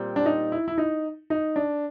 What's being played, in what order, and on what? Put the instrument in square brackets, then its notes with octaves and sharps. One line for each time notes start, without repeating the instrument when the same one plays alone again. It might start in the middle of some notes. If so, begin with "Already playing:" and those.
Already playing: [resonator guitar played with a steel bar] A#2 G3 C4
[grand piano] D4
D#4
E4
E4
D#4
D#4
D4